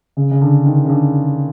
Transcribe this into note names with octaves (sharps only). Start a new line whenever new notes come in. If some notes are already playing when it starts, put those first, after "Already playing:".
C#3
C#3
D3
D#3
C#3
D3